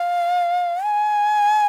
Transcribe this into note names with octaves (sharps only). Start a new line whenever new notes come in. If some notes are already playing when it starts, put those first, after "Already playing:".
Already playing: F5
G#5